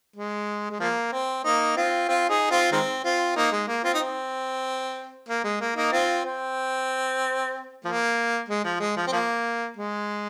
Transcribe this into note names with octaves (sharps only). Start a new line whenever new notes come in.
G#3
G#3
F3 A#3
C4
A#3 D#4
C4 F4
C4 F4
D#4 G#4
C4 F4
D#3 G#3 C4
C4 F4
A#3 D#4
G#3
A#3
C4 F4
D#4
C4
A#3
G#3
A#3
A#3 D#4
C4 F4
C4
F3 A#3
G#3
F3
G#3
F3
C4
F3 A#3
G#3